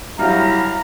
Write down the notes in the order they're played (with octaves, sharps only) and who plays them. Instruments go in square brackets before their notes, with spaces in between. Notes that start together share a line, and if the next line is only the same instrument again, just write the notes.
[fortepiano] F#3 G3 [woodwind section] E4 F5 [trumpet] A#5